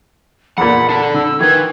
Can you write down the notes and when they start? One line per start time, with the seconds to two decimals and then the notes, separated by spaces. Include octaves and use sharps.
0.58 E2 A#2 F#5 B5
0.89 D4 A4
1.14 D3 E6
1.40 D#3 E3 B4 G#6